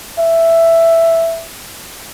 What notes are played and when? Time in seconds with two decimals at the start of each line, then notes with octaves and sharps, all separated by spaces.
0.19 E5